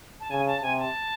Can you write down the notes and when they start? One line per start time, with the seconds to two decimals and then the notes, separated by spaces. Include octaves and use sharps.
0.20 A5
0.31 C#3 G#5
0.47 A5
0.62 C3 G#5
0.78 A5